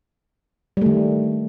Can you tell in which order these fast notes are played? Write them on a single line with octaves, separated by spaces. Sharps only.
G3 A3 D#3